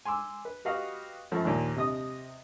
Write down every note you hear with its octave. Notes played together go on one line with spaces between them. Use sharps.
G#5 C6 D6 E6
B4
F#4 G4 B4 D#5 F5 F#5
F#2 F3 A3
D#2 A#2
C3 D#5 D#6